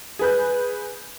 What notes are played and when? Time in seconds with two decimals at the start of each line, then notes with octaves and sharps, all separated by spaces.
0.19 G#4 B4 G6